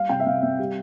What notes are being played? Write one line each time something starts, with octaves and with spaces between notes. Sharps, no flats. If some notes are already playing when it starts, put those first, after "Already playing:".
Already playing: G3 F5
C3 G5
E5
C3 F5
C4 E5
G3 G4